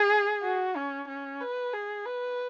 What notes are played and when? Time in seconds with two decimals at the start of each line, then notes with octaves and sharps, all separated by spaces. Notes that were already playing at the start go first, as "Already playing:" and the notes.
Already playing: G#4
0.43 F#4
0.76 C#4
1.08 C#4
1.41 B4
1.73 G#4
2.06 B4